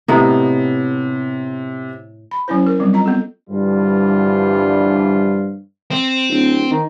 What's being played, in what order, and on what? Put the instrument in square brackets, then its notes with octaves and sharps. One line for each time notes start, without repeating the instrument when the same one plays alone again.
[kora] A2 B3 D#4 [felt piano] C3
[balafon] B5
F#3 C#4 E4 C5
A#4
F#3 G3 C4
F4 D#5 A#5
B3 C4 A4
[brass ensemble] G2 D3 E3 F3 G3 F4
[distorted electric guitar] C4
[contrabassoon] D1
D#3